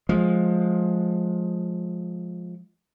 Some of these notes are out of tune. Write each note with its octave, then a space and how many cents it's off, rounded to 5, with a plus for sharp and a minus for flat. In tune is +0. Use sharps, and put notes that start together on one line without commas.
F3 +15 G#3 +15